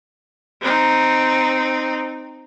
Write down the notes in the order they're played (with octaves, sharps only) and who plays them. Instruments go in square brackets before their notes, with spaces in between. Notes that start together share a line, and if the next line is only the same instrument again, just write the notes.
[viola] C4 D#4